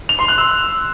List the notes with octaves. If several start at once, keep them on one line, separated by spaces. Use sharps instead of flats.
F7
C6
F#6
E6